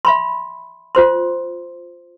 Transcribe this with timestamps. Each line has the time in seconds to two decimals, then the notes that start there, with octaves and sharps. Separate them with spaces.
0.05 E5 B5 C6
0.95 F4 C5 C6